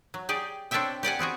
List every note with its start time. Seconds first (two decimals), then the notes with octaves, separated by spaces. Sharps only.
0.14 F#3
0.29 G4 G#4 D5
0.71 C4 D4 A4 C#5 E5 G5
1.03 G4 D5 F#5 G#5
1.19 B3 C4 F#4 G#4